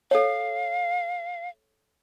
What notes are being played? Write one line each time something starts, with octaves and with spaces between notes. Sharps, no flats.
A4 C#5 F5